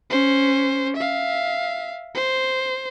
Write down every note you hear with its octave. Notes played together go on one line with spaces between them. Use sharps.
C#4 C5
E5 F5
C5